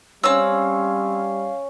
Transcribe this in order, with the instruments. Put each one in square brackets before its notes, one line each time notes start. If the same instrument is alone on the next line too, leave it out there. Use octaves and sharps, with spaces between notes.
[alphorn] G3 [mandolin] C4 E6 [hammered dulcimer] C#4 C#5 [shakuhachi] F5